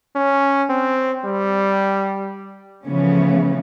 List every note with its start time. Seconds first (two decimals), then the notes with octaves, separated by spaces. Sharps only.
0.16 C#4
0.69 C4
1.25 G3
2.84 C#3 E3 F3 A3 B3 C#4